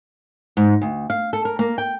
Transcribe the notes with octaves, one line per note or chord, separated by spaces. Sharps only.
G#2
D2
F5
A4
A#4
A#3
G5